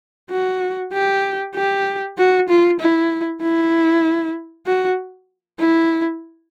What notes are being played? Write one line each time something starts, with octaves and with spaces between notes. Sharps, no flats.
F#4
G4
G4
F#4
F4
E4
E4
F#4
E4